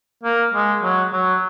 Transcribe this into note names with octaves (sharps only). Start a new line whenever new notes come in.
A#3
G#3
F#3
F#3